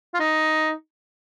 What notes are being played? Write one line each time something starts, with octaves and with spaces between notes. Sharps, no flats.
F4
D#4